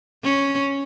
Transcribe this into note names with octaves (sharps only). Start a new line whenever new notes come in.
C#4